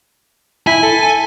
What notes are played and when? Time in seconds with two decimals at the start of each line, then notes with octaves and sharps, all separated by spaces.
0.67 E4 G#5
0.83 A4